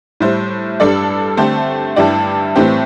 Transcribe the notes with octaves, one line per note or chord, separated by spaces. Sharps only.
A2 G3 E4 C5
G2 G3 D4 A4 D5
D3 A3 C4 G4 C5
G2 G3 E4 G4 D5
A2 E3 A3 C4 G4